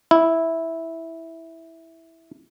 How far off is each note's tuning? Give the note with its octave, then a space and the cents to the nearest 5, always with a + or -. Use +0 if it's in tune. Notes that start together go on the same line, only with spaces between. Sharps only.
E4 -5